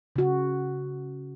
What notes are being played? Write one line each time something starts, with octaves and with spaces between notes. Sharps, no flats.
C#3 F#4